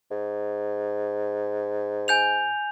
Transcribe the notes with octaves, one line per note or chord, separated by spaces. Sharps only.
G#2
G#5 G6 F7